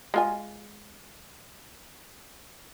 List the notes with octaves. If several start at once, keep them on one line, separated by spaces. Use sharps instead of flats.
G#3 F4 G#5